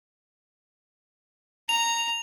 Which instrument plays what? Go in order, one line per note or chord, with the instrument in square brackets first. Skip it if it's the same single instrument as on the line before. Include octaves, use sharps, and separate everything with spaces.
[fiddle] A#5 [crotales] F7